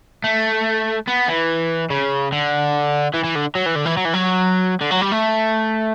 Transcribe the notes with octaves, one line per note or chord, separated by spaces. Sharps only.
A3
B3
E3
C#3
D3
E3
E3
D3
F#3
E3
D3
E3
F#3
E3
F#3
D3
F#3
G3
A3